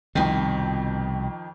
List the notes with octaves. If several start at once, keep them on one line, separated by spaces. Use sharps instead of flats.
C2 F2 B2 D#3